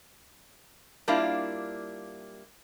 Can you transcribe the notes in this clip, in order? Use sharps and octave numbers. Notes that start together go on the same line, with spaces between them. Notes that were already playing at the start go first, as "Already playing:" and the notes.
G3 A#3 D4 E4 F4